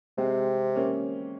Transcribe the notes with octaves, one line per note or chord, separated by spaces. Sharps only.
C3 G#3 C4
A#3 C#4